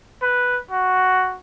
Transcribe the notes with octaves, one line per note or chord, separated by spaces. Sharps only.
B4
F#4